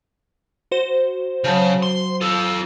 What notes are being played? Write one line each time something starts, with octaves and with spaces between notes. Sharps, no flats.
F#4 C5
C#3 F#3 A5 G6
C6
F4 A4